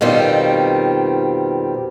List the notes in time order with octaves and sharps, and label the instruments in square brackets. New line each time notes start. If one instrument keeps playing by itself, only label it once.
[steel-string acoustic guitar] F2 B2 D#3 G3 C4 F4